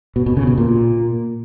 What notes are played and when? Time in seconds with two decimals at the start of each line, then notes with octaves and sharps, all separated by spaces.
0.16 B2
0.26 B2
0.37 C#3
0.47 B2
0.58 A#2